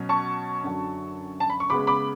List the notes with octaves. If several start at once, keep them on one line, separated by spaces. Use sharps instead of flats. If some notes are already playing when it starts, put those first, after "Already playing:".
Already playing: B2 F#3 C#4
A5 C#6
F#2 D3 F#3
A5
B5
C#6
C#3 G#3 B3 B5 D6
B5 D6